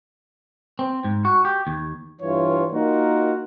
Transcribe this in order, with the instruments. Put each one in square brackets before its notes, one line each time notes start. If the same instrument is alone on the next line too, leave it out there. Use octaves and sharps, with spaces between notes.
[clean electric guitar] C4
G#2
F#4
G4
D#2
[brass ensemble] G2 E3 F4 C#5
A#3 D#4 F4 F#4 A#4